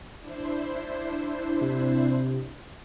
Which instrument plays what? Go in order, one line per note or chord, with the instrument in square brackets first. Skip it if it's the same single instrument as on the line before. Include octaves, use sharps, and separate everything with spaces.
[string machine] D4 E4 C5
[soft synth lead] C3